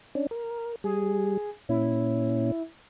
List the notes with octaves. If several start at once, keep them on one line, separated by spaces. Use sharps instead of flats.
C#4 D4
A#4
G3 G#4
A#2 C#4 E4